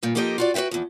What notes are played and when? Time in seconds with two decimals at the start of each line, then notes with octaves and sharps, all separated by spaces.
0.03 G2 A#2
0.15 F3 A#3 D#4 G4 A4 D#5
0.38 F4 F#4 D5
0.54 F#4 B4 D#5 E5 G5
0.71 E2 F3